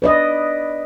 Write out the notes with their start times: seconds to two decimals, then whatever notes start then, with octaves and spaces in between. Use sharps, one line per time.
0.02 B4 D5 D#5